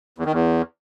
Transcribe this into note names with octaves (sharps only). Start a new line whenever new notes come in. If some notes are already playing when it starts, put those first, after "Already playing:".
E2
D#3
E2